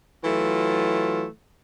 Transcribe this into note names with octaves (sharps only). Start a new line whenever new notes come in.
E3 F#3 A3 F4